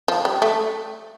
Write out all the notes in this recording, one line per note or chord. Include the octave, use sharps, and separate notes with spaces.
F3
G3
A3